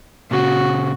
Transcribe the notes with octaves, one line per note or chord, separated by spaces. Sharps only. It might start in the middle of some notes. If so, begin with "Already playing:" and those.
A#2 C#3 F#4